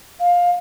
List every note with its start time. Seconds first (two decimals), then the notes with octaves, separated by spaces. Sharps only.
0.20 F5